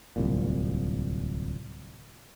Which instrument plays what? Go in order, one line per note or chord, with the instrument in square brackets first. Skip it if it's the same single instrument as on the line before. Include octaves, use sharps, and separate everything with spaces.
[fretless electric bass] D1 C2 A#2